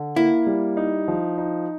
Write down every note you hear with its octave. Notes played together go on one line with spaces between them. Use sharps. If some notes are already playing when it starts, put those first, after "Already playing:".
Already playing: D3
A#3 E4
G3
D#4
F3
D#4